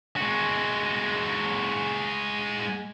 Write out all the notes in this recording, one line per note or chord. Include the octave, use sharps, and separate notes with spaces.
G#3 F#4